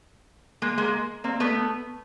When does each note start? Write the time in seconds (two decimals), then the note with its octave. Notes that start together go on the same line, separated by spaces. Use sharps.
0.62 G#3 A#3
0.78 G#3 A#3
1.24 A#3 C4
1.40 A3 B3